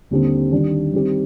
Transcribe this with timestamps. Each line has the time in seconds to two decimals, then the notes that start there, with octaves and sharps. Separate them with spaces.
0.11 D#2 D3 G3 C4
0.52 D#3 G3 D4
0.93 D#3 G3 C4